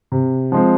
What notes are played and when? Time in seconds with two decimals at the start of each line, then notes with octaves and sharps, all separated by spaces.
0.12 C3
0.52 F3 G#3 C4